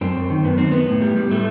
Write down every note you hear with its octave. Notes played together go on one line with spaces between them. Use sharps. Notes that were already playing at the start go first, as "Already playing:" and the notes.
F#2 C4
F#2
D#3
F#2 B3
D#3 C4
D#3 B3
A2
G3
G3
A2 A3